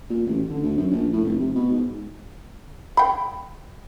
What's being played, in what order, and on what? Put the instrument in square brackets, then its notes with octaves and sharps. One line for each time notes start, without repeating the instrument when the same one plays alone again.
[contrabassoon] A#2
A1
D3
D2
F#2
A#1
A2
F1
C3
B2
G#2
[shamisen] G5 B5